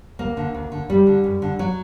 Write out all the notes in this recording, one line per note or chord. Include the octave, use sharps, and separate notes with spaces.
D2 A#3
D3
D2
D3
F#2 G3
D3
F#2
D3
F#3